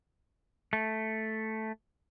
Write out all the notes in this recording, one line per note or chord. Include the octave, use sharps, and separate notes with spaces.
A3